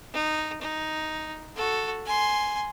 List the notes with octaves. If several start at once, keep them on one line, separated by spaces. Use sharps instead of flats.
D#4
D#4
F#4 A4
G#5 C6